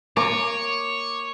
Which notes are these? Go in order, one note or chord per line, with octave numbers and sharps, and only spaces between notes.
A#3 C#5 C#6 D6